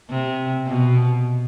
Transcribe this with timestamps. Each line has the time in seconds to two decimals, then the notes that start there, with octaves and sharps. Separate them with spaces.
0.10 C3
0.67 B2